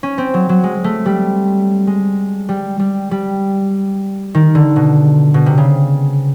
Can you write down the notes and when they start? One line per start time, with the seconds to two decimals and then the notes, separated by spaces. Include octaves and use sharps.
0.03 C#4
0.18 C4
0.34 F#3
0.49 F#3
0.64 G#3
0.84 A3
1.06 G3
1.87 G#3
2.49 G3
2.80 G3
3.11 G3
4.35 D#3
4.55 D3
4.76 B2
5.34 B2
5.46 C3
5.58 C#3